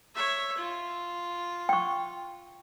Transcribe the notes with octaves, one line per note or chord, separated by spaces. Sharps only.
C#5 E5
F4
G5 C#6